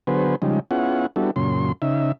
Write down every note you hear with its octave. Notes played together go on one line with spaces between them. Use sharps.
D3 F#3 B3 G#4 B4 C5
C#3 F3 G3 G#3 D#4
B3 C#4 E4 F4 G#4 F#5
G3 B3 D4 E4 F#4 A4
F#2 A#2 C#3 C6
C#3 D#4 E5